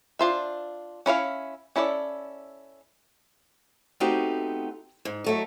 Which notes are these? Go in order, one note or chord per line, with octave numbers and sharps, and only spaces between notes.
D4 F4 C5 E5
C#4 E4 C#5 F5
C#4 E4 A4 B4 D5
A3 B3 C4 D#4 F#4 G4
G#2
F#3 A3 D#4